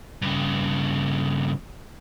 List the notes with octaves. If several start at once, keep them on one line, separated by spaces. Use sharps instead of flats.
G2 C#3